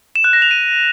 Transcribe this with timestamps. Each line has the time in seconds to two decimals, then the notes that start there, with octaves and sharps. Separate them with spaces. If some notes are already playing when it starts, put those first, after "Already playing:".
0.16 E7
0.24 F#6
0.33 A#6
0.42 F7
0.51 D#7